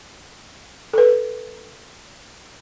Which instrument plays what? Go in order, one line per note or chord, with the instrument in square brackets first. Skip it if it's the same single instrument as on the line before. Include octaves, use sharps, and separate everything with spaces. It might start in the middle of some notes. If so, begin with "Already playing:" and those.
[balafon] A4 B4